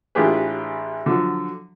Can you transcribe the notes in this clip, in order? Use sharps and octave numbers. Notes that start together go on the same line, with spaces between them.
A1 D4 F4 G4 G#4 B4
D3 F3 F#3